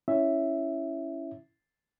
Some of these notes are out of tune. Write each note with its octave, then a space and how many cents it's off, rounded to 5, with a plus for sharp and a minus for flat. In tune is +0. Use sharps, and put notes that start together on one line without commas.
C#4 +0 E4 +0 E5 +0